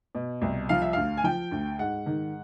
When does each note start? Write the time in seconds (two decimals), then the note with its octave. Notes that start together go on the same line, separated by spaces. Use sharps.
0.15 B2
0.42 C2
0.69 F3 F5
0.82 E5
0.93 D2 F5
1.17 G#5
1.24 F3 G5
1.51 D2
1.79 G#2 F#5
2.06 D#3